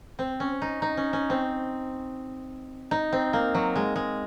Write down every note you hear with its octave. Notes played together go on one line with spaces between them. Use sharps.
C4
C#4
D#4
D#4
C#4
C#4
C4
D#4
C4
A#3
F#3
G#3
G#3